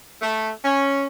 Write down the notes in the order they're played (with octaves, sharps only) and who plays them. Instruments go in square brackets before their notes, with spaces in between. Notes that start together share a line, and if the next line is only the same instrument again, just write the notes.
[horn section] A3
C#4